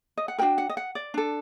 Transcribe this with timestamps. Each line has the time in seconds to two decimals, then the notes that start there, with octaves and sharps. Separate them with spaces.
0.17 D#5
0.28 F#5
0.38 D4 F#4 A#4 G5
0.58 F#5
0.69 D#5
0.77 F#5
0.95 D5
1.14 D4 A4